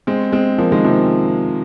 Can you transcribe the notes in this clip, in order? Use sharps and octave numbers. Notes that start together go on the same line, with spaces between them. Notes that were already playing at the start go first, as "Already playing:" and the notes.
G#3 C4
G#3 C4
F3 A#3
D#3 G#3
C3 F3